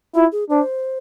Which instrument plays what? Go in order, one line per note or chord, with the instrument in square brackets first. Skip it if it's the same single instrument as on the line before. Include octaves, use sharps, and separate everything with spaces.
[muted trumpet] E4 [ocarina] F4
[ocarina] G#4
[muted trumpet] D4 [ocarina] C5